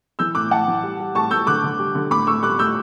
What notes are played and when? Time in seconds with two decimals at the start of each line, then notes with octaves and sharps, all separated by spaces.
0.19 E3 E6 G6
0.35 A2 D6 F#6
0.51 A2 F#5 A5
0.68 E3
0.83 G3
1.00 G3
1.15 A2 A5 C#6
1.31 A2 E6 G6
1.47 D3 D6 F#6
1.64 D3
1.79 G3
1.95 D3
2.10 A2 B5 D6
2.27 A2 C#6 E6
2.42 G3 D6 F#6
2.59 A2 E6 G6